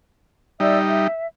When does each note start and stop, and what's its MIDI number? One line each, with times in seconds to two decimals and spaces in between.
0.60 1.07 55
0.60 1.07 63
0.60 0.78 74
0.60 0.78 76
0.60 0.78 88
0.89 1.27 76